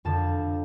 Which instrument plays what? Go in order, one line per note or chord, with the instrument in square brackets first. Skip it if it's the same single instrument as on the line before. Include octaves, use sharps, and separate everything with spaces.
[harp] F2 D3 F3 A5